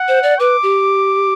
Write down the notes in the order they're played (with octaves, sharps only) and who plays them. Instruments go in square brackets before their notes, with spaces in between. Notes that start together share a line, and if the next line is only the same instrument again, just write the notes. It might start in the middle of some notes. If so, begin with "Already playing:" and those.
Already playing: [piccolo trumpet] F#5
[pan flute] C5
D5
[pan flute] B4 [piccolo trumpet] D6
[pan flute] G4